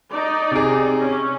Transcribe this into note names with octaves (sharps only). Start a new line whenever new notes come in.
D#4 D5
C3 G#4
C#4